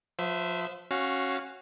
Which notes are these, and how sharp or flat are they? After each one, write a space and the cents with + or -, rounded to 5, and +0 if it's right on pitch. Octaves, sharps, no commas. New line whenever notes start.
F3 +30 C5 -40 E5 +0
C#4 -15 F#4 +0 F5 +5